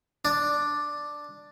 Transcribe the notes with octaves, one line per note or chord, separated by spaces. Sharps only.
D4